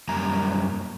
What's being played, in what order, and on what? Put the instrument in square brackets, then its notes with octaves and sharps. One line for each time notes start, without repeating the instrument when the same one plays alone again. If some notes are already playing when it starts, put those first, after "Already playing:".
[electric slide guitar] F#2 G3 A#3 A#5